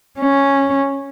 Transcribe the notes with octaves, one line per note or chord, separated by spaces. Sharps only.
C#4